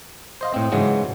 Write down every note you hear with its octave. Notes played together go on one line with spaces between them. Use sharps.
C5 D#5 F5
A2 C4
G#2 C#3 E3 F#3 G#3